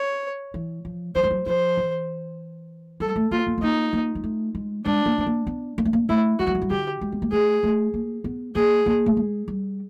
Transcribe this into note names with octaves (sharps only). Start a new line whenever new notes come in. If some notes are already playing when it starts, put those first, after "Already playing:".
Already playing: C#5
E3
F3
F#3 C5
G3
F#3
F3 C5
E3
G3 A4
A3
A#3 F4
A#3
B3
A#3 D#4
A#3
G#3
A3
G#3
G#3 D4
A#3
A3
A#3
B3
A#3
A3
A#3
A3 E4
G#3 F#4
G3
F#3
G3
D3 G4
G#3
B3
A#3
A3 G#4
A3
A#3
B3
A#3 G#4
A#3
A3
G#3
G3